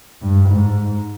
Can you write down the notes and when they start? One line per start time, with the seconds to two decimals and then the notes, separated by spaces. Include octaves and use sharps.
0.21 G2
0.49 G#2